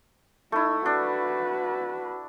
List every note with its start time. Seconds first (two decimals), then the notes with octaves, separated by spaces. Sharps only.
0.52 A3 D#4 E4
0.86 D4 F#4 B4